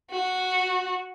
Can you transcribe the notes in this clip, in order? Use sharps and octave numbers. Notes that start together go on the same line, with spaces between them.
F#4